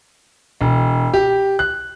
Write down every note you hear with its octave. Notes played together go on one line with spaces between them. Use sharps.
E1
G4
F#6